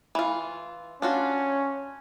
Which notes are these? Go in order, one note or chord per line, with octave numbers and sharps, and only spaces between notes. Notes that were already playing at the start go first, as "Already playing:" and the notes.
E3 F4
C#4 D4 F4 F#4